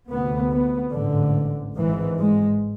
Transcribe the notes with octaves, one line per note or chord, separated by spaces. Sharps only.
D2 C3 B3
B3
A1 G#2 D3
G#1 G#2 E3
G#3